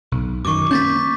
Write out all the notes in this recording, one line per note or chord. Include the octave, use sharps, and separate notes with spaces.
B1
F#2 D#3 C#6 D6
A#3 C#4 G6 A6 B6